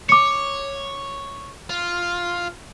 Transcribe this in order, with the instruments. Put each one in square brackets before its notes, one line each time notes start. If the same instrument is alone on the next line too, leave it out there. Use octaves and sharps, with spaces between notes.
[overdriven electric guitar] C#5 [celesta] D6 C#7
[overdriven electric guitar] F4